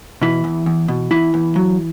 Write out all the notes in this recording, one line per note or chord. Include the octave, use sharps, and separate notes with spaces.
B2 E3 E4
E2
E2
B2
E2 E3 E4
E2
F#3